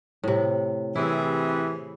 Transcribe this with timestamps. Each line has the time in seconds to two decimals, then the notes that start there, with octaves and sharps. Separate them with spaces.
0.24 A2 C3
0.95 C3 E3 E4 G#4